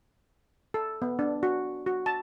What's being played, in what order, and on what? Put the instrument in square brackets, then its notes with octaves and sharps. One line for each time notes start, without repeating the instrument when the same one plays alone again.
[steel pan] A4
B3
D4
F#4
F#4
A5